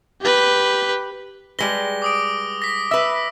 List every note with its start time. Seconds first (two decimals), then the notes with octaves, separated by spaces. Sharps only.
0.21 G4 B4
1.59 G3 G#3 B4 A#6 G7
2.02 D6 D#6 D7
2.62 A#6 B6
2.91 B4 E5 E6